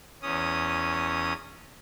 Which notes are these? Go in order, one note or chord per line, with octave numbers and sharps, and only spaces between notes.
E2 C#4 D#6